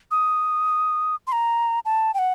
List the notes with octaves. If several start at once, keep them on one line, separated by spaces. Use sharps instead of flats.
D#6
C6
A#5
A5
G5
F#5